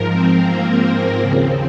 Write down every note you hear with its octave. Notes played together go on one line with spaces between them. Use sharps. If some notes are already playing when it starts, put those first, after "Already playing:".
Already playing: G#2 F3 A#4
C4
A#3
D#2 C#3 F3 C4